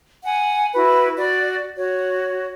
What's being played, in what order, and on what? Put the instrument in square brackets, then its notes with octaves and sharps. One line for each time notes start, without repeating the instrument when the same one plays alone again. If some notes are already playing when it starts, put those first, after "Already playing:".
[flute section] F#5 G#5
E4 F#4 B4
F#4 D5
F#4 C#5